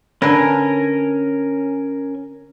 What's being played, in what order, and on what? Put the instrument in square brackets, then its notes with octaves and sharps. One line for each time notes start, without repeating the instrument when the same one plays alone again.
[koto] D3 B4 [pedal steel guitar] C#4 A#4 G#5